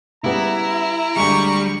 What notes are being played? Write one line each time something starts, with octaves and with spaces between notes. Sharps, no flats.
C#3 G3 B3 E4 A#5
D2 G3 G#3 C#6